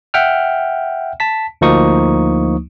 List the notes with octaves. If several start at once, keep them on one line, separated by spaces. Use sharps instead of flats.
E5 F#5 G5 F6
A5 B6
D2 F3 A#3 D#4 C#6 D#6